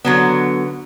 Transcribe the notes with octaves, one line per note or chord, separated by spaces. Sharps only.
D3 F#3 B3